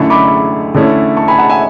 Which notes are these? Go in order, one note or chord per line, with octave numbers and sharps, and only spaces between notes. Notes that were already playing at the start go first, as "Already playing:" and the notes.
Already playing: F#2 D3 A3 E4 A5 C#6
B5 D6
D3 A3 C#4 E4
A5 C#6
G#5 B5
F#5 A5
E5 G#5